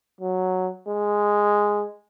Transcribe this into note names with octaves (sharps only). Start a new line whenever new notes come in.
F#3
G#3